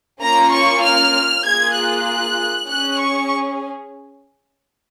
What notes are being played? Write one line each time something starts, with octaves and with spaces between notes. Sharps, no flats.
A#3 C#4 F4 A#5
C#6
F6
A#3 F4 G#4 G#6
F#6
C#4 G#4 F#6
C#6